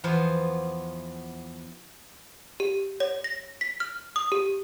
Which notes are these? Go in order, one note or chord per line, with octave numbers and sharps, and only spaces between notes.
E2 F3 B3 C5
G4
C#5
A#6
B6
F6
D#6
G4